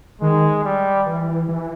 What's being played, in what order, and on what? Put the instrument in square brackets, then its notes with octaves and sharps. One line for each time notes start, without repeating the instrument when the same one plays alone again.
[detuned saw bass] D#3 [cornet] G#3
[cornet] G3
[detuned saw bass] E3
E3